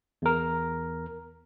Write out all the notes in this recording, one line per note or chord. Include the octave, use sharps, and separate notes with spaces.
E2 A#4